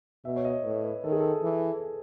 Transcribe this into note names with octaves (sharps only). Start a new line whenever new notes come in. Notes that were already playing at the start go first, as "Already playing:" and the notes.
B2 E5
C#5
D#5
A2 B4
B4
D#3 A4
G#4
A4
E3